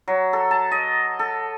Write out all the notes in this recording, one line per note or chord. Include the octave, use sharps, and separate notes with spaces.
F#3
A4
A5
D#5
A4